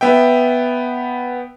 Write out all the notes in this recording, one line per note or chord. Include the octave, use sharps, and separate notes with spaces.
B3 E5 G5